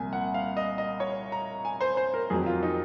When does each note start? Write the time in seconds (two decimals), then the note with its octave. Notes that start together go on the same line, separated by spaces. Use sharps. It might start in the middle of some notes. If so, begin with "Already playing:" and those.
Already playing: C2 A#2 F3 G#5
0.13 F#5
0.34 F5
0.57 D#5
0.78 D#5
1.00 C#5
1.32 A#5
1.65 G#5
1.81 C5
1.97 C5
2.14 A#4
2.30 F2 D#3 F#3 G#4
2.46 F4
2.63 D#4